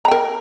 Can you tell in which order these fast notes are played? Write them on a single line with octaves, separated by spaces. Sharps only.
A#5 G5 A#4